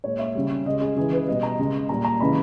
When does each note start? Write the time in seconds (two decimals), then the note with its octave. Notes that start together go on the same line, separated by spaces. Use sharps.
0.04 A#2 G#3 C#5
0.19 E5
0.35 C#3 G3
0.66 C#3 G#3 D#5
0.81 G#4
0.96 C#3 E3 G#3 G#4
1.13 B4
1.28 B2 G3 D#5
1.43 A#5
1.59 C#3 G#3
1.89 A#2 G3 A#5
2.04 A#5
2.20 C#3 E3 G#3 B5